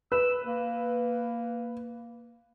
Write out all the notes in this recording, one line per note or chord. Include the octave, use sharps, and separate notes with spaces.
B4 E6
A#3